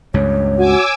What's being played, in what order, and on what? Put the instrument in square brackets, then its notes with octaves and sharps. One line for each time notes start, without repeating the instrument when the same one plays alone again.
[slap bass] C#2 G2 [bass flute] C#5
[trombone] F#4 [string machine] G#5 D6 E6